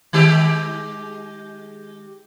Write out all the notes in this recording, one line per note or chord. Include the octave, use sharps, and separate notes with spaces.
D#3 G#3 G4